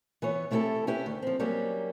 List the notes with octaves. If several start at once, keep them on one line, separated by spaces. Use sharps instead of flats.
E3 B3 C#5
C3 A3 E4 F#4 G4 A4
C#4 E4 G4 B4
D2 D#3
F3 C4
F#3 G3 A#3 C#4 G4